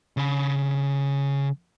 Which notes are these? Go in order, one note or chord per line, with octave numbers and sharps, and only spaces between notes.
C#3 B5